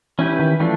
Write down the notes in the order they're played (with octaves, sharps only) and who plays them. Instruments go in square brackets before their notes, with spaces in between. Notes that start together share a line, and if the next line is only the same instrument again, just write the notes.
[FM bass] E3 [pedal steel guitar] C#4 E4 G4 B4
[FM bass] D#3
[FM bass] E3 [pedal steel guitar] F3 A3 D4